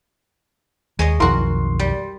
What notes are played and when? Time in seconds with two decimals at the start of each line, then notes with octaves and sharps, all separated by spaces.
0.99 D#2 G#3 C#5 D#5
1.20 B1 F2 D#3 F#4 A#4 C6
1.79 G3